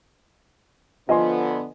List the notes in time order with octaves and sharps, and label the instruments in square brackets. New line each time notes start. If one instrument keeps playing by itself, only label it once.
[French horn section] D3 B3 [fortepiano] F3 [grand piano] D#5 G#5 C6